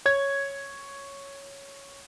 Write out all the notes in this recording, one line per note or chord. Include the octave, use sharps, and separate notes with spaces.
C#5 G#6